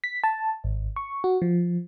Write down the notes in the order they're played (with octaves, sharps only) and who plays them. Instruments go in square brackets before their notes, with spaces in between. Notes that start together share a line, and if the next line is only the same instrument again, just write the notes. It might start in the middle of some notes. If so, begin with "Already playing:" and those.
[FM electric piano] B6
A5
G#1
C#6
F#4
F3